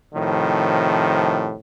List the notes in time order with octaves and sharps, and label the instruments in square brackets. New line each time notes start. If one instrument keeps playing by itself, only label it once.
[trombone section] A2 C3 D#3 F3